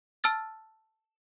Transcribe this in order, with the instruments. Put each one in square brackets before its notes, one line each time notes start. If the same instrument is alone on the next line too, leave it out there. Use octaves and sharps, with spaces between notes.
[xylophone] A5 E6 F6 A6